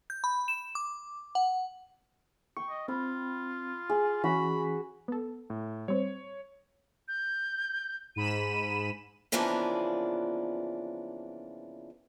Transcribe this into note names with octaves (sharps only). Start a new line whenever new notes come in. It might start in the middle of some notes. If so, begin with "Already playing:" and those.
G6
B5
E7
D6
F#5
G5 C#6
D#5
C4 F4 B5
G#4
E3 C#4 F#4 B5
B3 A4
A2
G3 C4 C#5
G6
G#2 B5 D#7 E7
C#3 E3 F3 A#3 B3 D4